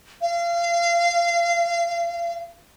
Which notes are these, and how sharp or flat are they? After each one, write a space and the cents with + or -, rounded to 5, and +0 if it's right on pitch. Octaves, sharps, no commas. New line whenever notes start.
F5 -30